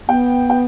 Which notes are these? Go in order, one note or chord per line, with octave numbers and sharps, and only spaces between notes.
B3 G5
G5